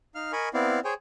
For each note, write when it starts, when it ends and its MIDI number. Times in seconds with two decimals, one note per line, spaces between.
0.15 0.32 63
0.15 0.32 77
0.15 0.32 89
0.32 0.49 70
0.32 0.49 75
0.32 0.49 80
0.32 0.49 83
0.32 0.49 85
0.54 0.80 59
0.54 0.80 60
0.54 0.80 64
0.54 0.80 74
0.54 0.80 77
0.85 0.94 68
0.85 0.94 72
0.85 0.94 73
0.85 0.94 79
0.85 0.94 80